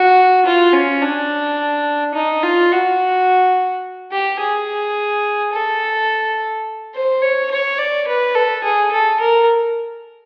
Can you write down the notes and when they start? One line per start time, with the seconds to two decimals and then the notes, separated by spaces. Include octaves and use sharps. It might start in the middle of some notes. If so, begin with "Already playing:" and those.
Already playing: F#4
0.46 F4
0.73 C#4
1.02 D4
2.14 D#4
2.43 F4
2.71 F#4
4.12 G4
4.41 G#4
5.53 A4
6.95 C5
7.22 C#5
7.51 C#5
7.79 D5
8.08 B4
8.35 A4
8.64 G#4
8.92 A4
9.20 A#4